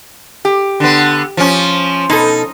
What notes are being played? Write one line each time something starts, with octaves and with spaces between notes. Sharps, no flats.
G4
D3 B3
F3 C#4
B2 D#4 A4